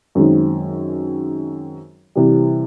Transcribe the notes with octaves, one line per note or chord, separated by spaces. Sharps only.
F#2 D#3 G#3 C4 D#4
C3 E3 G3